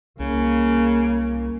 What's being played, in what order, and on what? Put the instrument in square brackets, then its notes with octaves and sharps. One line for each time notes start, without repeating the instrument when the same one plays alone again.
[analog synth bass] C2 [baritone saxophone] C#3 [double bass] A#3